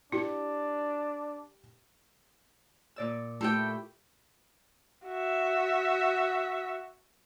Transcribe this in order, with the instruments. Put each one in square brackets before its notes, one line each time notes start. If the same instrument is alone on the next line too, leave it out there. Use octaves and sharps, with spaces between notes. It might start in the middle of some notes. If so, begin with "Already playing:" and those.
[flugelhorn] D4 [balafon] E4 [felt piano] G4
[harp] A#2 D5 E6
[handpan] A3 E4 [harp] F4 G4 [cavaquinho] A4 G5
[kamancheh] F#4 E5